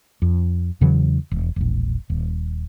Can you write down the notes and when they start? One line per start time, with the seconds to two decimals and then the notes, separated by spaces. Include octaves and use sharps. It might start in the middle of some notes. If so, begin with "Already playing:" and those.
0.22 F2
0.81 E2 C#3 E3 F#3
1.31 E1
1.56 E1 A#1
2.10 D#1